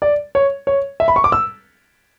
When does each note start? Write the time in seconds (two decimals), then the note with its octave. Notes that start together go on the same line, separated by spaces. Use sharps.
0.02 D5
0.35 C#5
0.67 C#5
1.00 E5
1.08 B5
1.16 C#6
1.24 D6
1.32 E6